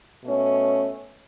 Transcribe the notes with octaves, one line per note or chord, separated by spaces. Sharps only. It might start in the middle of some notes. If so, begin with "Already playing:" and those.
B2 A3 C#4